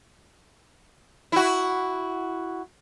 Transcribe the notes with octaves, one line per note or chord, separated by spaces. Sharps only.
E4 F#4